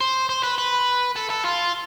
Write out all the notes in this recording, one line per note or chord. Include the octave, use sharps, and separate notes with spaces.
C5
C5
B4
B4
A4
A4
F4